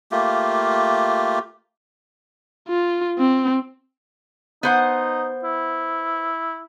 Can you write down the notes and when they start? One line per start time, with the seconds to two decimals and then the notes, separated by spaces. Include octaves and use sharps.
0.12 A3 A#3 F4 G4
2.68 F4
3.18 C4
4.63 B3 D#4 C5 F#5
5.44 E4